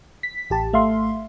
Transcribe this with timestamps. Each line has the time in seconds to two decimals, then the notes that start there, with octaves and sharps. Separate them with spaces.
0.23 B6
0.50 A1 G4 A5
0.73 G#1 A3 E5 F5 C6